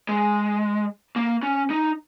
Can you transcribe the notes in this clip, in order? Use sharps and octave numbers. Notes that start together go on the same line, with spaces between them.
G#3
A#3
C#4
D#4